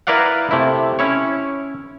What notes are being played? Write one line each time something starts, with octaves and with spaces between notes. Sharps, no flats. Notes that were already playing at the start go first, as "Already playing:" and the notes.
E4 A#4 B4 D5 F5 F#5
C3 A3 E4
C#4 E4 C#5